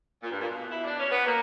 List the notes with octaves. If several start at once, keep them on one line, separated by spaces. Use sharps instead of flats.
A#2
G2
A#2
B2
E4
D4
C#4
B3
A#3